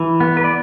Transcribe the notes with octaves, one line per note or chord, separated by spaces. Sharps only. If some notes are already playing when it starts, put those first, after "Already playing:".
Already playing: E3
B3
B4
D5